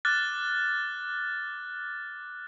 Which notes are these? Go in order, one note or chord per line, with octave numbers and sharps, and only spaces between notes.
D6 F6 F#6 A6